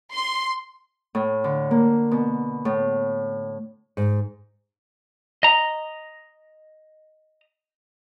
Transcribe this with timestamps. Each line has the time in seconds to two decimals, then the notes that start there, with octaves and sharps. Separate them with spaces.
0.15 C6
1.15 A2
1.44 D3
1.71 A#3
2.12 B2
2.65 A2
3.97 G#2
5.43 D#5 A#5